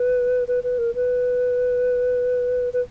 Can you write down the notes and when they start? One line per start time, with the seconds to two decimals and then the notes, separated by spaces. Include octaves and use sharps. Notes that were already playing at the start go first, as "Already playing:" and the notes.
Already playing: B4
0.48 B4
0.64 B4
0.78 A#4
0.95 B4
2.73 B4